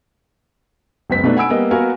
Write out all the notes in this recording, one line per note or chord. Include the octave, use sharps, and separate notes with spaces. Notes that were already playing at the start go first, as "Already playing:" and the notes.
F#1 C#2 B3 C5 B6
B2 A3 B3 D4 D#4
F#5 G#5 B5 E6 D7
G3 A#3 B3 D#5
B3 F#4 A#4 F5 G#5